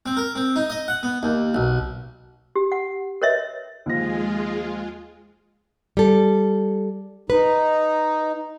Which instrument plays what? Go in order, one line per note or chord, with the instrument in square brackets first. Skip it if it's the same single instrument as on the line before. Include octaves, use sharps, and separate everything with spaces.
[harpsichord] C4
A#4
C4
D#4
D#5
F#5
B3
D#2
B1
[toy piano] G4
F#5
A#4 B4 C#5 D#5 E5
[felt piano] D#2 F3 A#6 [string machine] G#3 F4 G#4
[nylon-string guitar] G3 A4
[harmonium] D#4 [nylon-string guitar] B4